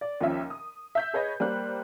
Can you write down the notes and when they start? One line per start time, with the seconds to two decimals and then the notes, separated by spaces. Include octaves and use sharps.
0.01 D5
0.21 D#2 F3 C#4 E5
0.50 D#6
0.95 E5 G6 B6
1.14 G#4 B4 C#5 D#5
1.40 G3 A#3 C5 F#6